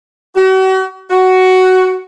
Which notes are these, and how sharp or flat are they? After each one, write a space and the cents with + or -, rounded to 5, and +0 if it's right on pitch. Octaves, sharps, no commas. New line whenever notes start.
F#4 +40
F#4 +10